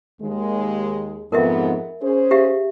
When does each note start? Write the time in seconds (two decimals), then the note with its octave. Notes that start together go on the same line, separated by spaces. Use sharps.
0.22 D#2 G#3
1.32 F2 G#2 B3 A#4 D#5 E5
2.02 C#4 G#4 C5
2.31 G4 E5 F5